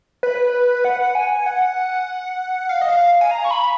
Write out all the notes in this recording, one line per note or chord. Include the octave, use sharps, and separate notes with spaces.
B4
F#5
G#5
F#5
F5
D#5
F5
G#5
A#5
C#6
B5